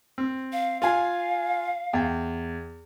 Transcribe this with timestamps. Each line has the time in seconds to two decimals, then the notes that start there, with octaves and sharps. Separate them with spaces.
0.18 C4
0.53 F5
0.82 F4 F5 G#5
1.93 E2 G5